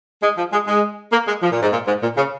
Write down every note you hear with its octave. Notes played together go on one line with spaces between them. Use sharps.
G#3
F3
G#3
G#3
A#3
G#3
F3
A#2
G#2
A#2
G#2
A#2
C#3